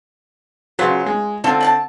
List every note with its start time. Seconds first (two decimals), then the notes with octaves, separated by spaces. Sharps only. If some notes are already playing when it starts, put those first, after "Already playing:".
0.79 C#3 F#3 F4 B4 C5
1.06 G#3
1.44 D3 C4 F4 A4
1.61 A4 F#5 A5